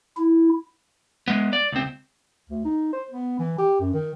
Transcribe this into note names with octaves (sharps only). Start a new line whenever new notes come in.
E4
G#3 B3
D5
C#2 C4
D2
D#4
C5
B3
E3
G4
F#2
D#3